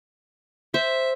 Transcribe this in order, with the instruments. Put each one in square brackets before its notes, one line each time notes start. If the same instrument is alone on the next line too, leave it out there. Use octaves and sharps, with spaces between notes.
[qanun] C5 [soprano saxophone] E5